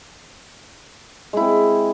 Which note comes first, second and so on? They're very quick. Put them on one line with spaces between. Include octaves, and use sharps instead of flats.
G#3 E4 C4